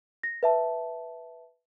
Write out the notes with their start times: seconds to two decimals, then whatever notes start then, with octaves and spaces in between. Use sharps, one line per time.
0.23 A#6
0.43 B4 E5 A5